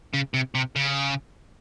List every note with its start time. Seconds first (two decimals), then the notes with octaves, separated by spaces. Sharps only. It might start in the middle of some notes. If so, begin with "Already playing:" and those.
0.14 C#3
0.34 C3
0.55 C3
0.76 C#3